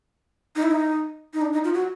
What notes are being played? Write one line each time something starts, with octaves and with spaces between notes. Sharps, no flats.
D#4
E4
D#4
D#4
D4
D#4
F4
F#4